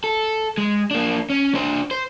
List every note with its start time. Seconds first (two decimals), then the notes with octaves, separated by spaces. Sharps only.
0.04 A4
0.58 G#3
0.91 A#3 D4
1.30 C#4
1.55 D4 C5
1.91 C5